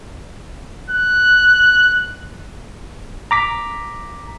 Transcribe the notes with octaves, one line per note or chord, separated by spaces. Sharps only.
F#6
A#5 D6 B6